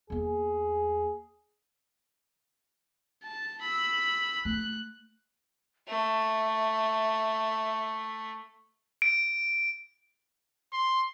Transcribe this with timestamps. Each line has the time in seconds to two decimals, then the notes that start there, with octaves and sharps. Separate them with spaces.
0.10 E2 A#3 G#4
3.24 A5
3.62 B5 E6
4.45 A3 F#6
5.88 A3 E5
9.02 D7
10.73 C6